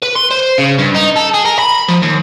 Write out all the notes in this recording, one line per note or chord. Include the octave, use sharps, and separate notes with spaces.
B4
C6
C5
C#3
G2
D#4
A4
G#4
A#4
B5
F3
D#2